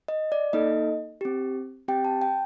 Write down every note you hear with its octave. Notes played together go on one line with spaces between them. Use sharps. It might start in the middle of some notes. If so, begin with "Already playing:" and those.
D#5
D5
A#3 D#4 A4 D#5
C4 G4
C4 G4 G5
A5
G5